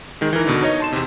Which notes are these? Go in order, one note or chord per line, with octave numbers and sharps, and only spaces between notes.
D#3 G#3
E3 A#4
B2 D3 D#4
D#4 C#5 D#5
A5 C6 E7
E2 C3